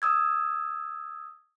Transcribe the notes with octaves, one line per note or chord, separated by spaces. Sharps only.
D#6 E6 G#6